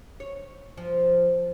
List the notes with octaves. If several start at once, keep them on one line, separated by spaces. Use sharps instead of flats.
C#5
F3